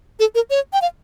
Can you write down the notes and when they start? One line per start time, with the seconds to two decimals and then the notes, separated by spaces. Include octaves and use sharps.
0.20 A4
0.35 A#4
0.50 C#5
0.73 G5
0.82 F5